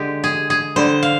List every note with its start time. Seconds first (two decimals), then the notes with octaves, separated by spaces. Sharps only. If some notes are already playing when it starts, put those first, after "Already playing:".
Already playing: D3 G#3 G4
0.24 G#4
0.50 G#4
0.76 D3 G3 C5
1.03 F5